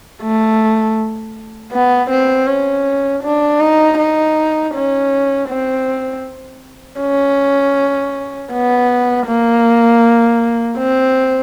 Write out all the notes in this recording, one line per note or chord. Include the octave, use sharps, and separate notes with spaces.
A3
B3
C4
C#4
D4
D#4
D#4
C#4
C4
C#4
B3
A#3
C4